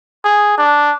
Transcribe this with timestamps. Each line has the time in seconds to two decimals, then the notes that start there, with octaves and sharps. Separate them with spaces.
0.24 G#4
0.58 D4